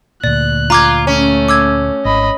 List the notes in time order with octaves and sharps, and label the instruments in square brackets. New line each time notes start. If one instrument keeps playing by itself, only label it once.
[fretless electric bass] D2 A#2 [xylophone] D5 [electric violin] F#6
[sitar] F4 [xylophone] A#5 D6 G#6
[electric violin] A3 [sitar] C#4
[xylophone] D6 E6 G#6
[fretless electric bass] G#1 [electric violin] D#5 B5